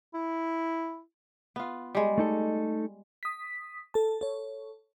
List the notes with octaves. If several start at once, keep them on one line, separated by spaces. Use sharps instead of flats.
E4
B3 F4
G3 G#3
A3 D#4 A4
D#6 B6
A4 A5
A4 C#5